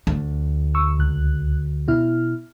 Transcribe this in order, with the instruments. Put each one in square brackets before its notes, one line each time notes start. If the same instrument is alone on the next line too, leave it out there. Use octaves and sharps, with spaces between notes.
[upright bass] D2
[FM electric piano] C#6 E6
C#2 F#6
B2 E4 F6